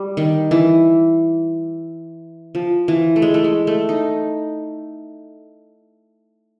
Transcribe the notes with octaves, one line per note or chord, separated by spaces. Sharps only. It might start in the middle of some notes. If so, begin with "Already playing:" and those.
Already playing: G3
D#3
E3
F3
E3
A3
G#3
A3
G#3
A3
D#4